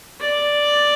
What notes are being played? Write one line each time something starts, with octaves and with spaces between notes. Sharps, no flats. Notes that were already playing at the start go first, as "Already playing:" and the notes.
D5